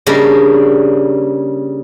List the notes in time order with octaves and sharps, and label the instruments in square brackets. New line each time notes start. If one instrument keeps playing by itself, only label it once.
[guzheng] C#3 G3 A#3 D4